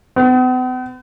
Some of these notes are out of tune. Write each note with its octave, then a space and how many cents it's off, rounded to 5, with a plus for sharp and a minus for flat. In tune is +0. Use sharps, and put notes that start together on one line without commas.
B3 +45